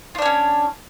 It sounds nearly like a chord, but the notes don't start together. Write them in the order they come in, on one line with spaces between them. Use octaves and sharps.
F4 D4 C#5 C#4